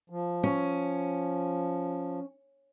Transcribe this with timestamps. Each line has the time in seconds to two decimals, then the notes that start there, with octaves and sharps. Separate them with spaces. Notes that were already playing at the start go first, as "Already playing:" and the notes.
0.10 F3
0.44 C#4